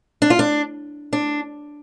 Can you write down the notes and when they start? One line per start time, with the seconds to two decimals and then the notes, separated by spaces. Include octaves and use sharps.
0.22 D4
0.30 F4
0.39 D4
1.13 D4